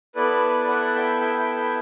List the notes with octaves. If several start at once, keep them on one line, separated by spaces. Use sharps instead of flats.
B3 E4 A4 B4 D5
D5 F#5
E5 G5
E5 G5
E5 G5
E5 G5